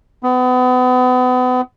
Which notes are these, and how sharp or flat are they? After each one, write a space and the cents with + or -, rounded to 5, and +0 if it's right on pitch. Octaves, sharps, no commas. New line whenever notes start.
B3 +35